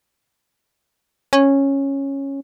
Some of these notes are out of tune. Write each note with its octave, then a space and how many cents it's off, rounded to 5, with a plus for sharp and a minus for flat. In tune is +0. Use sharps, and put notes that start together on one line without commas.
C#4 -10